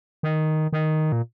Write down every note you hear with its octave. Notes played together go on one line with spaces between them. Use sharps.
D#3
D#3
A#2